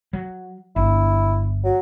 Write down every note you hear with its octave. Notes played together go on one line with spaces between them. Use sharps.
F#3
G1 E4
F#3